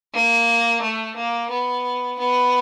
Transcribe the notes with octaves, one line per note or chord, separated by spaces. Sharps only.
A#3
A3
A#3
B3
B3